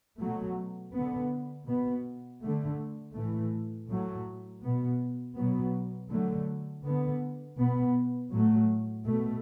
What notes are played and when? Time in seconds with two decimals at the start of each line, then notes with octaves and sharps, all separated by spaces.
0.21 B2 F#3 A3
0.94 D3 B3
1.67 B2 B3
2.42 D3 A3
3.15 A2 E3 A3
3.89 A2 F#3 A3
4.63 B2 B3
5.36 B2 F#3 B3
6.11 D3 F#3 A3
6.84 D3 B3
7.58 B2 B3
8.31 A2 F#3 A3
9.05 B2 A3